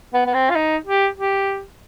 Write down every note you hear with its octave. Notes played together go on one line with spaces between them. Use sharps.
B3
B3
C4
F4
D#4
G4
G4